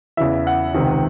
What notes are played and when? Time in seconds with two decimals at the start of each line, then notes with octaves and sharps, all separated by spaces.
0.17 E2 C#3 E3 E5
0.47 F#5
0.74 C#2 C3 D#3